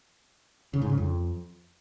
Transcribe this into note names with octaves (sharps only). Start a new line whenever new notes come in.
C#3
G#2
C#3
F2